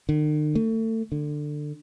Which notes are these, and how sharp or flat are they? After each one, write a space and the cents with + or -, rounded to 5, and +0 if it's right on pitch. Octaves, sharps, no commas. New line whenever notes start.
D#3 -45
A3 +30
D3 +20